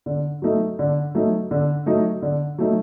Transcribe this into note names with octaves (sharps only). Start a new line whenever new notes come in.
D3
F#3 A3 D#4
D3
F#3 A3 D#4
D3
F#3 A3 D#4
D3
F#3 A3 D#4